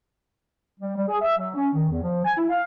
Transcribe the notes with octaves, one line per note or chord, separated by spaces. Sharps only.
G3
G3
G#4
E5
F#3
C#4
D#3
E2
F3
G#5
E4
F5